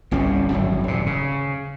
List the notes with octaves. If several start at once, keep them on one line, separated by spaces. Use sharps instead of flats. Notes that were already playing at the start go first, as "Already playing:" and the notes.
G1 C2 C3 C#4
G#1 F#2 A2
D#1 C3
C#3